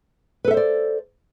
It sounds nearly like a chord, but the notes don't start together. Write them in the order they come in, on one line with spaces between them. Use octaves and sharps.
B4 A4 E5 C5 D5